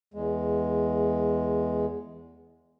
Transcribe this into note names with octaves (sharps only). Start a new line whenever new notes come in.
E2 G#3